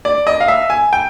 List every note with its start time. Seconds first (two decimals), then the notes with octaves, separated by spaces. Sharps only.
0.05 D5
0.27 D#5
0.40 F5
0.48 E5
0.70 G#5
0.93 G5